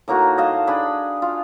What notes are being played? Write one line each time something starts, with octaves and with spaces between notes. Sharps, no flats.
A2 A#3 D#4 F#4
D#5 F5 A5
D4 G#4 D#5 B5
F4